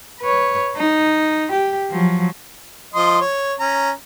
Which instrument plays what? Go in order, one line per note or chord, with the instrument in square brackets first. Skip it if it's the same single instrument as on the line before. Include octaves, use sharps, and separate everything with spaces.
[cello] B4 C#5
D#4
G4
F3 F#3
[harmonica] F3 D#5 C6
C#5
C#4 A#5